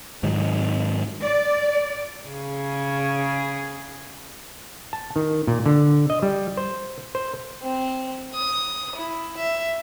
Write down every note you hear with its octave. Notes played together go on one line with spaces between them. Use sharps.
G#2 D#3 F#3
D5
C#3 G#4
A5
D#3
A#2
D3
D#5
G3
C5
C5
C4
D#6
E4
E5